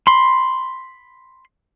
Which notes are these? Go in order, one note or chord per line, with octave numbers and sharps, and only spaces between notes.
B5 C6